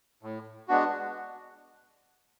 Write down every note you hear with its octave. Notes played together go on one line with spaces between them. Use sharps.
A2
G#3 B3 D4 F#4